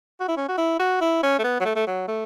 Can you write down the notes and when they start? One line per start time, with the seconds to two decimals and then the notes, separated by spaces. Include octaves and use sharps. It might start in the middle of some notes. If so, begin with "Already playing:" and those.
0.20 F#4
0.28 E4
0.37 C#4
0.49 F#4
0.58 E4
0.79 F#4
1.01 E4
1.23 C#4
1.39 A3
1.44 B3
1.60 F#3
1.65 A3
1.76 A3
1.87 F#3
2.08 A3